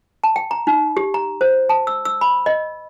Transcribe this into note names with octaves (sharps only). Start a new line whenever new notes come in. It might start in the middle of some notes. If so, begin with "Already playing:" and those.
A5
G5
A#5
D#4
G4
A#5
C5
A5
E6
E6
B5
D#5